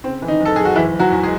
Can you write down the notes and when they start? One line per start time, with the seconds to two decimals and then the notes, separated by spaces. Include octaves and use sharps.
0.04 C#3 C4
0.22 E3
0.28 D#3 D#4
0.40 F#1
0.45 A4
0.56 F#1 G#4
0.65 F#4
0.76 F#1 E3 E4
0.94 F#1
0.99 F#3 F#4
1.12 E2
1.23 G#3 G#4